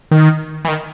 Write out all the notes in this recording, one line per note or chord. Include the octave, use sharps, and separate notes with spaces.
D#3
E3
D#3